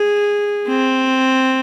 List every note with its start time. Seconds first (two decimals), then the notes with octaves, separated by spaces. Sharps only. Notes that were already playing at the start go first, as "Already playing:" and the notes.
Already playing: G#4
0.68 C4